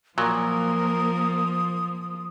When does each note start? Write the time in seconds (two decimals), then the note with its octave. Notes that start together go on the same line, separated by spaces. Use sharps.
0.18 A#2 F3 F#3 A#3 A#4 D#6